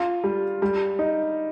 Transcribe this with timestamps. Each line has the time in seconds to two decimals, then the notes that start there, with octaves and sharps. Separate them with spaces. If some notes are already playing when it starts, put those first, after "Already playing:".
Already playing: F4
0.24 G3
0.62 G3
0.99 D#4